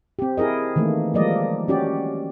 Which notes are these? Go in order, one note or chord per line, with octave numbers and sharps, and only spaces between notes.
C4 G4
E4 G#4 A#4 D#5
D#3 E3 A3 A#3
F3 G3 G#3 A#3 D5 D#5
C#4 F#4 G4 D5